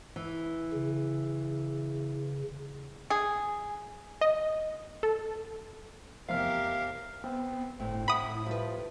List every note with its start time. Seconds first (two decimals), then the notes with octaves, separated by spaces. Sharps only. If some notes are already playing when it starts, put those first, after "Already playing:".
0.16 E3
0.73 C#3
3.10 G#4
4.21 D#5
5.03 A4
6.29 F1 E2 G4 A#4 E5 F5 F6
7.24 B3 C4
7.80 G1 A2 C4
8.08 A2 E4 F#5 B5 D#6
8.46 F3 G3 B4